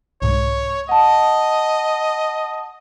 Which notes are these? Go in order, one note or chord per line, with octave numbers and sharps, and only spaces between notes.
C2 G#2 C#5
D#5 F#5 A5